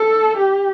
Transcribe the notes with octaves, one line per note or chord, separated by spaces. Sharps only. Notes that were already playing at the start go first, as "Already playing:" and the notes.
Already playing: A4
G4